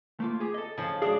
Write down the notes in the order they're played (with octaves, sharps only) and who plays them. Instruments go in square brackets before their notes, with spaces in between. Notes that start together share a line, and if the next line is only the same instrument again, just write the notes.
[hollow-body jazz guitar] A3 A#3 F4
G4 G#4
A4 D#5
[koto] C#3 F3
[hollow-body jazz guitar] G#2 F#4 F5 [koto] D4 [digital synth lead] G#4